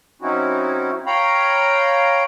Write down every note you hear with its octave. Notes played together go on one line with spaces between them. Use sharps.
F#3 C4 C#4 D#4 E4 F#4
C#5 F5 G5 A#5 B5